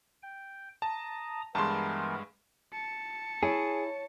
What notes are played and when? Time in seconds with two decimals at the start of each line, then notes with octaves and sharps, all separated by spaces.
0.23 G5
0.82 A5 A#5 D#6
1.55 G2 E3 G#3 B3 A#4 A5 C6
2.72 A5 C#7
3.43 E4 G#4 C#5